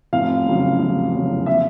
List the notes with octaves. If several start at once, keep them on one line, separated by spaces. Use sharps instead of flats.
F1 F5
E2 C#3 F#3
F1
E2 C#3 F#3
E5